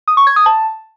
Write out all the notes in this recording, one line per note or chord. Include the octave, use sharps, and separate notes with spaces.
D#6
C#6
G#6
D#6
A5